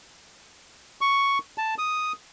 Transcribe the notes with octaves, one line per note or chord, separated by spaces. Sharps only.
C#6
A5
D#6